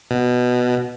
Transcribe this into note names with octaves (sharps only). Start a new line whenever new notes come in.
B2